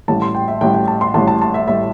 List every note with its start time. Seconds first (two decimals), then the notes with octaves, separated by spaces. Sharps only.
0.08 A1 A2 G3 A5
0.22 C6
0.35 G5
0.48 E5
0.61 A1 A2 G3 G5
0.74 G5
0.88 A5
1.01 C6
1.14 A1 A2 G3 A5
1.28 A5
1.42 A5
1.54 E5
1.67 A2 G3 E5